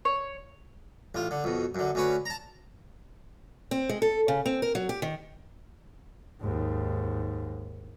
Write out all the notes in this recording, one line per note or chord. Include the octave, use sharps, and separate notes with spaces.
C#5
A1 F4
D3
F2 B2
F#2 D3
D2 C#4 B4
A5 A#5
C4
G#3
A4
C#3
C4
A#4
F#3
G4
D#3
D#2 G#2